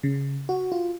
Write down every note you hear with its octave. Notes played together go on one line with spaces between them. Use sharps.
C#3
F#4
F4